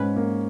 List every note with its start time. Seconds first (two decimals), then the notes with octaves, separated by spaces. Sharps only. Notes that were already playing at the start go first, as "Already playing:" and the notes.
Already playing: G#2 C#4 B4
0.16 A#3